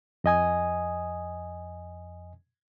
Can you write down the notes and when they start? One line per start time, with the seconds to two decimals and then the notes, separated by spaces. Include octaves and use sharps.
0.24 F2 D#5 G#5 D#6